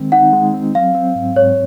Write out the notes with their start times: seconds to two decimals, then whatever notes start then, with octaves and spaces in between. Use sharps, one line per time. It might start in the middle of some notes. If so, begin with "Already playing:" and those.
Already playing: D#3 G#3 C4
0.12 D#4 F#5
0.33 G#3
0.54 C4
0.75 F#3 F5
0.95 C4
1.16 G#2
1.36 G#2 C#5